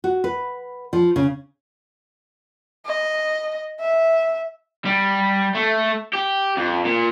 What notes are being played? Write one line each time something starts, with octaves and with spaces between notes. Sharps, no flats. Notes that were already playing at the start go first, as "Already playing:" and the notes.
F#4
B4
F3
C#3
D#5
E5
G3
A3
G4
F2
A#2